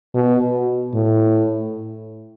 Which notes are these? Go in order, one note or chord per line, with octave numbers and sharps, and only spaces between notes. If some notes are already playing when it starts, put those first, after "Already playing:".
B2
A2